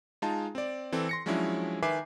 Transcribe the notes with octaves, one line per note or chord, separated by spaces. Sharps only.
G#3 D#4 F4 A5
C4 D5
E3 C4 A4
C6 A#6 C#7
F3 F#3 G#3 C#4 D4 E4
D#3 B4 E5 G#5 D6 C7